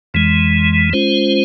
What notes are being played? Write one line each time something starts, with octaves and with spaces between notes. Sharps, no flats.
F2 E3 G#3
G#3 C#4 F4 C5